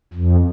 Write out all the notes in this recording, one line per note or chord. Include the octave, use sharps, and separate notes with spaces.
F2